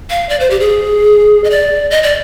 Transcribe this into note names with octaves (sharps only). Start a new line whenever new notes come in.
F5
D5
C5
G4
G#4
D#5
D5
D#5
D5